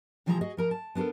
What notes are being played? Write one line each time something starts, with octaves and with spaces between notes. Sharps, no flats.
C3 E3 F3 G#3 D5 A#5
F#4 G#4 D#5
F3 A#4 A#5
A5
B3 D4 G4 A4 A#4